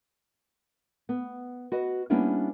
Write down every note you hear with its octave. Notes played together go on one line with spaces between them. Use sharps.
B3
F#4 B4 D#5
G3 A#3 B3 C#4 D4 E4